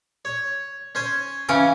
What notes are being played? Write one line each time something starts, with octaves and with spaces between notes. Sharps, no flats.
C#5
C#4 C5 G#5
C#3 E3 C#4